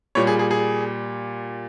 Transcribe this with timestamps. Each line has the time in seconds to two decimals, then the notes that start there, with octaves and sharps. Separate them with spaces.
0.15 A#2 G3 C#5
0.27 G#4
0.39 G#4
0.51 G#4